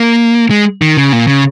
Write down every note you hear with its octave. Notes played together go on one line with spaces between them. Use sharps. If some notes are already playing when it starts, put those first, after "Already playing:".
Already playing: A#3
G#3
D#3
C#3
A#2
C#3